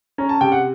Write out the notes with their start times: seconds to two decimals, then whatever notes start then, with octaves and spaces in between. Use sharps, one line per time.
0.18 C#4 A#5
0.29 A5
0.41 C3 G5
0.52 F#5